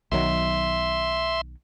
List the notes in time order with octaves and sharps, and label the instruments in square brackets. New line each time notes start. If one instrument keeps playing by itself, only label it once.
[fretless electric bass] B1 D#3 F#3 [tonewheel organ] E5 C6